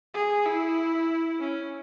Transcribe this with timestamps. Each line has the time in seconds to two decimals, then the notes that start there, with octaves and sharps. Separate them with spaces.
0.14 G#4
0.46 E4
1.40 C#4